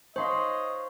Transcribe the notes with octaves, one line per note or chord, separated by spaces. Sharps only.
C5 C#5 D#5 F5 C6